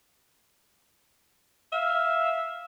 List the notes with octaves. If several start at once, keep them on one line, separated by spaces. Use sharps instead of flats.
E5 F5